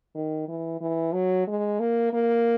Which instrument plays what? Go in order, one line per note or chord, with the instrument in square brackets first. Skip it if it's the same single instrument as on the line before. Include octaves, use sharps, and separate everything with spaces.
[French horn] D#3
E3
E3
F#3
G#3
A#3
A#3